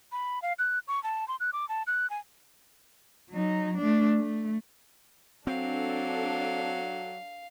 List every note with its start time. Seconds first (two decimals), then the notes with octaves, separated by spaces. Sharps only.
0.12 B5
0.42 F5
0.59 F#6
0.88 C#6
1.03 A5
1.28 C6
1.40 F#6
1.53 D6
1.69 A5
1.87 F#6
2.10 G#5
3.30 F#3 D#4
3.77 A3 D4
4.19 A3
5.47 F#3 C4 D4 A4 F5